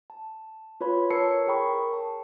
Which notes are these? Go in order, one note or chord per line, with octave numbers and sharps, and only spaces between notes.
A5
F4 B4 C#5 B5
A#4 C#5 A5 E6 C7 C#7
G#4 A#4 G5 B5 C#6
A5